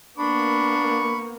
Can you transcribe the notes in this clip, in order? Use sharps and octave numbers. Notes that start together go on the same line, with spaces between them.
A#3 B3 D4 B5 C#6